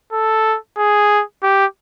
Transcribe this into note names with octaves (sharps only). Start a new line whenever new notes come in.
A4
G#4
G4